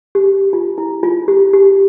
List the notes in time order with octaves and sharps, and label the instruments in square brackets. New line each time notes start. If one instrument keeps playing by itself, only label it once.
[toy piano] G4
F4
E4
F4
G4
G4